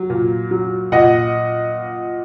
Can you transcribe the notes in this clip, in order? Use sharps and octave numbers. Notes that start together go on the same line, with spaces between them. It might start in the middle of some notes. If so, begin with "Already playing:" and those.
Already playing: F#3
A#2
F#3
A#2 D#5 F#5